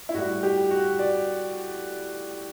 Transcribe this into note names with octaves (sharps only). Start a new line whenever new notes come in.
E4
A2 G3 F#4
G4
F#4
D5